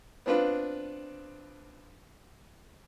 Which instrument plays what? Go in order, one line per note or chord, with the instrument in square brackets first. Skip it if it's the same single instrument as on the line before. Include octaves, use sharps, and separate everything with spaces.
[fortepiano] B3 C4 D4 F4 B4